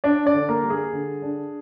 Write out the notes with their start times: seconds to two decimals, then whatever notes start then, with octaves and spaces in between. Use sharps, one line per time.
0.04 D4 D5
0.26 D4 D5
0.34 D3
0.49 A#3 A#4
0.63 G3
0.70 G#4
0.93 D3
1.22 D4